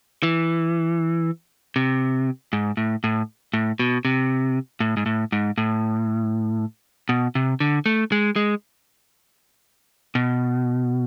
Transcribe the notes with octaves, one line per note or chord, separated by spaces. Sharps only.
E3
C3
G#2
A2
A2
A2
B2
C3
A2
G#2
A2
G#2
A2
B2
C3
D3
A3
G#3
G#3
B2